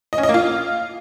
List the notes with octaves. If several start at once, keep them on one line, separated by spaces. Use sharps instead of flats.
D#5
C#4
D#5
A#3
F4